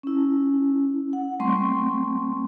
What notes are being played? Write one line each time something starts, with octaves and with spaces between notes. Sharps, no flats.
C#4 E4
F#5
G3 A3 C4 C6 C#6